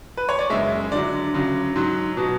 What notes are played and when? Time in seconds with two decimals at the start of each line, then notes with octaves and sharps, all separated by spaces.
0.17 B4
0.29 C#5
0.39 D5
0.50 F#2 C#3 G#3 E5
0.92 D2 D3 F#3 D5
1.34 D2 C#3 F#3
1.76 G#2 F#3
2.17 B2 F#3